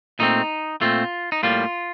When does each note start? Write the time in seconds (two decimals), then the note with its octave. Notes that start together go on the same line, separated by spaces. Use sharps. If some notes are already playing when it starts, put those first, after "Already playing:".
0.19 A#2 A3 C4 D#4
0.81 A#2 A3 C4 F4
1.32 D#4
1.43 A2 G3 A#3 F4